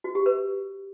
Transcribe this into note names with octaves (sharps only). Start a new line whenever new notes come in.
F#4
G4
B4